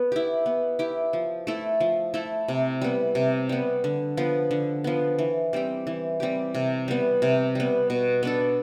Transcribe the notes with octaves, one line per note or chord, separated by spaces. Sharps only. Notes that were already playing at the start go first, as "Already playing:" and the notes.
Already playing: B3
E4 G4
B3
E4 G4
F3
A3 E4 A4
F3
A3 E4 A4
C3
G3 B3
C3
G3 B3
D3
F3 B3
D3
F3 B3
E3
G3 C4 G4
E3
G3 C4 G4
C3
G3 B3
C3
G3 B3
B2
B3 D4 A4